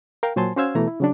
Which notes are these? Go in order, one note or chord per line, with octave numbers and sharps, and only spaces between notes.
A#4 F5 G5
A#2 F#3 C5 G#5 A5 C6
C#4 F#4 C5 F5 E6 G#6
B2 E3 A3 A#5
E4
C#3 F#3 D4